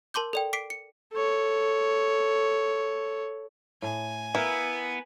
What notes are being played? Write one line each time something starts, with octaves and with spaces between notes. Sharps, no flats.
A#4 A5 C6 D6 G6
A4 D5 G5
D6 B6 C7 D7
C#7
A4 C#5
A2 G#5
B3 E4 A#4 B4 F5